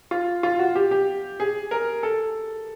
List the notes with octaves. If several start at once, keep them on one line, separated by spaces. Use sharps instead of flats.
F4
F4
F#4
G4
G4
G#4
A#4
A4